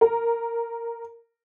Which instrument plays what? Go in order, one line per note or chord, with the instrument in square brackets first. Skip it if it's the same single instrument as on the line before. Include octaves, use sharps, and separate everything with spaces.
[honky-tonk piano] A#4